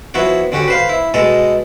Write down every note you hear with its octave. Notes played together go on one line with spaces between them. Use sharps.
F3 B3 E4 F#4 C#5
D3 C#4 F#4 G4
B4 C5 F5
E4
B2 G#3 A4 D#5